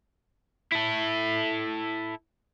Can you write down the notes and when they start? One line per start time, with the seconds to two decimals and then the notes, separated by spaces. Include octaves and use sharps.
0.72 E4 A4